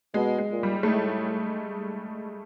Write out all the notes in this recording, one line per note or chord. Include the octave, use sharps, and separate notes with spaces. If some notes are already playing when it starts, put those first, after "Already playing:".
B2 G#3
G#3
A#2
G3
A3
A2 G#3